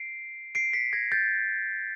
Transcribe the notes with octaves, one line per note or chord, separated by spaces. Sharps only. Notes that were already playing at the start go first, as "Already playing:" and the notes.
Already playing: C7 D7
C7 D7
B6 C#7
G#6 A#6
G6 A6